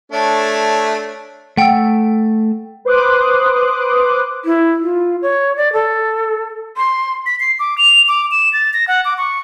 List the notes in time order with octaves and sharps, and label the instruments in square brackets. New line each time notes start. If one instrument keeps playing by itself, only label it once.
[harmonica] A3 D4 C#5
[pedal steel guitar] A3 E6 [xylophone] F#5 G5
[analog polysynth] B4 C5 C6 D6 D#6 F#6
[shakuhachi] E4
F4
C#5
D5
A4
C6
[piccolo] B6
C7
D6
F7
D6
E7
A6
A#6
F#5
D6
C#6